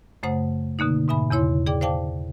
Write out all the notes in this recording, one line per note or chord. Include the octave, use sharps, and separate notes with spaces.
F#2 C#3 A3 C5 F#5 D#6
B2 D3 A#3 D#4
G#2 B2 E5 G#5 B5
E2 C#3 E4 C#5 C6
G#4 D5 G5 D6
C5 D5 F5 G5 A5 D6